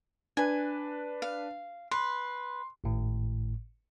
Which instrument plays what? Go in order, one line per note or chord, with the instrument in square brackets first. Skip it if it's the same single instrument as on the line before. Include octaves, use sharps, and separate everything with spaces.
[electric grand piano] D4 B4 [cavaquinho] G#5
[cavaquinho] F5
[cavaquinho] B4 [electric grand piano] C6
[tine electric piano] G#1 A2